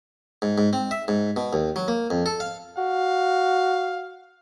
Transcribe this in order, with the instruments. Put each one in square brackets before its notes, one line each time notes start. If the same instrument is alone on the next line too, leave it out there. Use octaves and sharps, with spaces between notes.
[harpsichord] G#2
G#2
C4
E5
G#2
B2
D#2
F#3
A#3
F2
A4
F5
[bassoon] F#4 [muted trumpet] F5